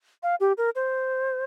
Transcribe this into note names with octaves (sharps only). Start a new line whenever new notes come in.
F5
G4
A#4
C5